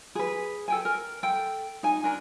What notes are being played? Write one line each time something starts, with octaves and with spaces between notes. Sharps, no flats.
G#4 B4
A4 G5 G#5
A#4
A4 G5
D#4 G#5
D4 A#4